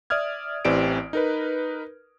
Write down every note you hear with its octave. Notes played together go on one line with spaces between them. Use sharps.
D5 E5 D#6 F6 G#6
A1 E3 C4 G4 D5 D7
D#4 A#4 B4